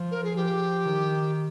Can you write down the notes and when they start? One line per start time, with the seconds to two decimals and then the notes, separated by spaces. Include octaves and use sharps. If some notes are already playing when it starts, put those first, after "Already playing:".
Already playing: F3
0.11 A#4
0.24 G#4
0.36 F3 G4
0.86 D#3